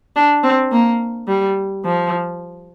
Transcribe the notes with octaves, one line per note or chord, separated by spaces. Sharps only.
D4
C4
A#3
G3
F3